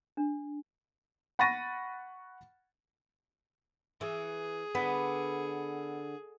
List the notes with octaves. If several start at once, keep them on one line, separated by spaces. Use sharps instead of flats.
D4
F#5 B5 C#6 A6 A#6 D#7
E3 G#4
D3 B3